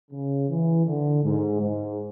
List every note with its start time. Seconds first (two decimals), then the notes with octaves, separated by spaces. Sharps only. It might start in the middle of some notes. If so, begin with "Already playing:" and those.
0.11 C#3
0.49 E3
0.85 D3
1.24 G#2
1.61 G#2